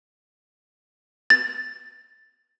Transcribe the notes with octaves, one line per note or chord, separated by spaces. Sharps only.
A6